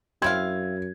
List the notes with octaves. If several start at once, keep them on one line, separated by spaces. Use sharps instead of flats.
F#2 C4 E4 F5 G#6